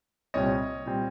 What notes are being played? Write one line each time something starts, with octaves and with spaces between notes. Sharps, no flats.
C2 A#2 G3 C4 C#5 D#5
A#2 G3 C4